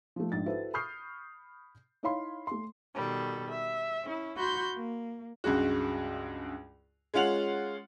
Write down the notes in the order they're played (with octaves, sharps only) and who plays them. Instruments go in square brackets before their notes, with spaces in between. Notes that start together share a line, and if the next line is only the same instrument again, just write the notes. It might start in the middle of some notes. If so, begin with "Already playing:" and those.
[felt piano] F3 A3
A#1 G#2 A6
E4 F#4 A4 B4 C5 E5
B5 C#6 D#6 F6 G6 C7
D#4 E4 C#5 F5 B5 C6
A3 C6
[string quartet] B2 D#3 G3 A4
E5
C#4 E4
F#4 B5 C6 G6
A#3
[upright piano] C#2 G2 G#3 F#4
G#3 C#4 F4 F#5 F7 F#7